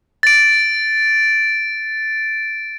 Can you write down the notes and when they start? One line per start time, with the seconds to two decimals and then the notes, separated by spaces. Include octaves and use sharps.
0.23 A6 D7